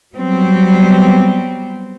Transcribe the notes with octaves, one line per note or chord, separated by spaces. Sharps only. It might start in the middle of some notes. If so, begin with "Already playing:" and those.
F#3 G3 B3 C4